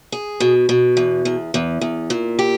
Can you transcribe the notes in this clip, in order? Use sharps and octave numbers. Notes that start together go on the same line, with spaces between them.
G#4
B2
B2
E2
E2
E2
E2
A#2
G4